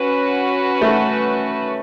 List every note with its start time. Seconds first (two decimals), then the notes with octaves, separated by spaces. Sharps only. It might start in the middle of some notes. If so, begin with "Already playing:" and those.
Already playing: C#4 F#4 B4
0.81 A3